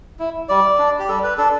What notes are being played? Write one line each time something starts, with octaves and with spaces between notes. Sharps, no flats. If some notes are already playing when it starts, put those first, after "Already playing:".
E4
G3 D5
D4
G4
G3 A4
B4
D4 A4